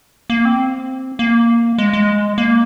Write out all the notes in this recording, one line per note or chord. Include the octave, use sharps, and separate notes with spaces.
A#3
C4
A#3
G#3
G#3
A#3